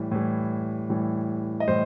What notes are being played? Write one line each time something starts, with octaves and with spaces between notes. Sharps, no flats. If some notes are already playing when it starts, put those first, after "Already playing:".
Already playing: A2 E3 G3
A2 E3 G3
A2 E3 G3
D#5
A2 E3 G3 C5